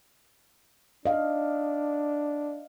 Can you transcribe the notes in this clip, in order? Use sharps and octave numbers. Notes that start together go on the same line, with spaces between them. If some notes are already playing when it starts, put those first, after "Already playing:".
D4 D#5 F5